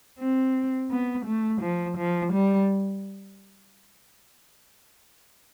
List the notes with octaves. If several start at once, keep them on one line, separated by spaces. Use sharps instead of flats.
C4
B3
A3
F3
F3
G3